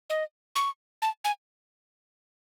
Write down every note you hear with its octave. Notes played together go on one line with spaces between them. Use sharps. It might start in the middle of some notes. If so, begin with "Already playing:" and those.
D#5
C#6
A5
G#5